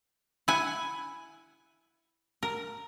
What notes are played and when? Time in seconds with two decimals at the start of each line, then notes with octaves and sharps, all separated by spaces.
0.48 E4 F#5 G#5
2.43 A#4